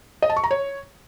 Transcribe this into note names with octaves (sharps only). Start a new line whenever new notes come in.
D#5
A5
C#6
A#5
C#5